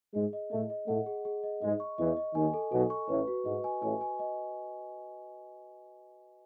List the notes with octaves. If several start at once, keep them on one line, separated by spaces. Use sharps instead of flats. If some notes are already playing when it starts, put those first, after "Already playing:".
G#2 G#3 G#4
D#5
A2 A3 D#5
D#5
A2 A3 F#5
G#4
G#4
D#5
G#2 G#3 D#5
C#6
E2 E3 D#5
D#5
D#2 D#3 G#5
A4
B1 B2 A4
C#6
A1 A2 B4
F#4
G#2 D#5
G#5
A1 A2 G#5
G#5
D#5